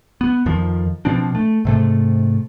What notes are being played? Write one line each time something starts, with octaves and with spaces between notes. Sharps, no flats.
B3
F2 D#3 F3
B2 F3 C4 D4
A3
G#2 C3 A3